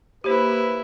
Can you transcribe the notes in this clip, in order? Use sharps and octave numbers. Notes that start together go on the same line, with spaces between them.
A#3 E4 G4 B4 C5